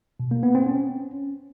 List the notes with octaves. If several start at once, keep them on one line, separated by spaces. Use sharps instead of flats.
B2
A#3
B3
C4
C#4